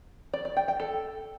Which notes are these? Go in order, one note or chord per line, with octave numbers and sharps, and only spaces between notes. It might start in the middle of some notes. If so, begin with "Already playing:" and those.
D5
D5
G5
G5
A4